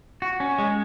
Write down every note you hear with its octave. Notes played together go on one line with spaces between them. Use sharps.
F#4
C#4
G#3